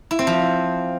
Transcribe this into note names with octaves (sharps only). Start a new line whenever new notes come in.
E4
C4
F3